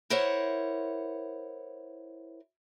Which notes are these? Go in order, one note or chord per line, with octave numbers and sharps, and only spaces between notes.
E4 A#4 C5 C#5 F#5